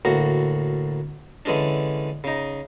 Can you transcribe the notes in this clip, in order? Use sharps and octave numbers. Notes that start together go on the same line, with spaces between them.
D2 A2 A#3 F#4
D3 E3 G#3 C#4 D4
C#3 D#4